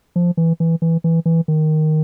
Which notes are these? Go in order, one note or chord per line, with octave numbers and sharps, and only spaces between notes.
F3
E3
E3
E3
E3
E3
D#3